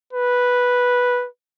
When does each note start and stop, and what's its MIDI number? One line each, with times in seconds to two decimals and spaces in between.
0.13 1.27 71